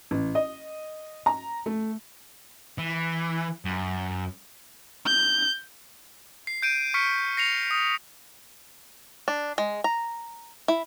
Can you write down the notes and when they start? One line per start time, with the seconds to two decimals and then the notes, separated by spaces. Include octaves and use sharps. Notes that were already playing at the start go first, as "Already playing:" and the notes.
0.11 A1
0.35 D#5
1.26 A#5
1.66 A3
2.78 E3
3.65 F#2
5.06 G6
6.47 C7
6.62 G6 D7 D#7
6.94 C#6 F6 B6 C#7
7.37 A#6 C7 C#7 F7
7.71 D#6
9.28 D4
9.58 G#3
9.84 A#5
10.68 E4